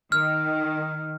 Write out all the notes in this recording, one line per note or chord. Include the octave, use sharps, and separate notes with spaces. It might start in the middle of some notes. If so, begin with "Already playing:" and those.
D#3 F6